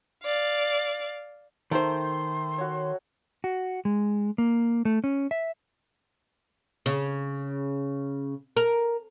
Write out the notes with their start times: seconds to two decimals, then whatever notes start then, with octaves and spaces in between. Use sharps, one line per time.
0.24 D5 F5
1.71 D#3 A3 C5 G5 A#5 C6
2.58 F#4 C#5
3.44 F#4
3.85 G#3
4.38 A#3
4.85 A3
5.04 C#4
5.31 E5
6.86 C#3
8.56 A#4